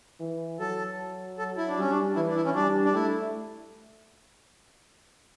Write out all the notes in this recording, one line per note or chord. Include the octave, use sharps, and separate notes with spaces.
E3
F#3 A4
A4
E4
D4
G3 C#4
D4
E3 E4
D4
E4
C#4
G3 D4
D4
A3 E4